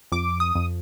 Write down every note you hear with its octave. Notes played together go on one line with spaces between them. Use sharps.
F2 D6
D#6
F2